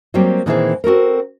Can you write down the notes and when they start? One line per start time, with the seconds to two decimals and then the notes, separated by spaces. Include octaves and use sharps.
0.14 F#3 G3 A#3 C4 G4
0.46 A#2 D#3 E3 C4 E4 G#4
0.84 C4 F#4 A4 A#4